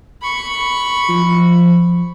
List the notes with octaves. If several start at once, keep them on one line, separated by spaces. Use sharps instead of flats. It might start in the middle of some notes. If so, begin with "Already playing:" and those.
B5 C#6
F3